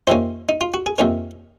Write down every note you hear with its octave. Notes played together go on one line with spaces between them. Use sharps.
F2 C3 D#3 A#3 C#4 C5
D#4
F4
F#4
G#4
F2 C3 D#3 A#3 C#4 A#4